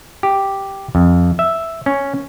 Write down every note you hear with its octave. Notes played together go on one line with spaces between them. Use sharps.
G4
F2
E5
C#4